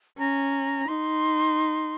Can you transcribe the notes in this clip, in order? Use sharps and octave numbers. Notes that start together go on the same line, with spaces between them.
C#4 A#5
D#4 C6